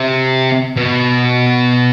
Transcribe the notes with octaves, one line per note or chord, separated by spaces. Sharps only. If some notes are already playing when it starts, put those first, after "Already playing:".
Already playing: C3
B2